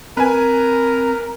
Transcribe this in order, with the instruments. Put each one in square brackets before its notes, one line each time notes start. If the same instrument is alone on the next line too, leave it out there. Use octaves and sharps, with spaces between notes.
[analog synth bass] C4 [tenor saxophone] A#4 [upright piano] B4 G#5